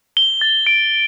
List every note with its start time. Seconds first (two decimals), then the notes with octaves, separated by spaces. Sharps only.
0.17 G7
0.41 A6
0.67 D7